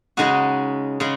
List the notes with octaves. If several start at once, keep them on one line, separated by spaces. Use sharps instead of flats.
C#3 G#3 D#4 F#4
C#3 G#3